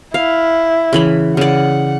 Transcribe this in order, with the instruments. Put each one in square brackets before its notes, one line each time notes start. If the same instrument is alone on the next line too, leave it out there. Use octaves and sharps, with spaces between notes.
[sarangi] E4 [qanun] F5
[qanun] C#3 E3 B5
[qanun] C#3 D5 [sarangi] F#5